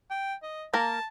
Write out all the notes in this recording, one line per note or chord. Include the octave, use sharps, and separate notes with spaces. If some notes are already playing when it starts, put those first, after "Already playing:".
G5
D#5
A#3 A#4 A5